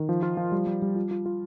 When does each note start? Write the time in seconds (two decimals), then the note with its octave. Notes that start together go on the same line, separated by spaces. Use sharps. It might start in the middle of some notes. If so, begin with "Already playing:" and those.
Already playing: D#3
0.09 F3
0.23 F4
0.37 F3
0.52 G3
0.67 G3
0.82 G3
0.96 F4
1.11 F4
1.26 F4